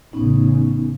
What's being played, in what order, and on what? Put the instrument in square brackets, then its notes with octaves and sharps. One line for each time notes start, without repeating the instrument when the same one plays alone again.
[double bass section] A1 C#3 [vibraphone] B3 C#4 D#4